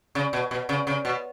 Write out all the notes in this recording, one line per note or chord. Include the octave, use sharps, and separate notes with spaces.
C#3
B2
B2
C#3
C#3
B2